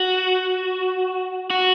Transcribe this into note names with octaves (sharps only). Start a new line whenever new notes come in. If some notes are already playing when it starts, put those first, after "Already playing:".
Already playing: F#4
F#4